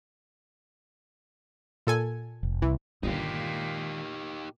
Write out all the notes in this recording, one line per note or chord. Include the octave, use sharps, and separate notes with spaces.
A#2 A4 G#5
F1
C2 E3
G1 A#2 D#3 G#3 D#4 G4